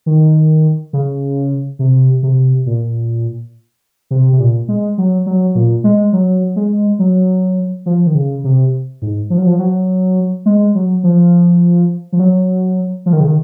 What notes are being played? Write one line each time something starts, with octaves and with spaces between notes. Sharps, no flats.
D#3
C#3
C3
C3
A#2
C3
C3
A#2
G#3
F#3
F#3
A#2
G#3
F#3
G#3
F#3
F3
D#3
C#3
C3
G#2
F3
F#3
F3
F#3
G#3
F#3
F3
F3
F#3
F3
D#3
C#3
D#3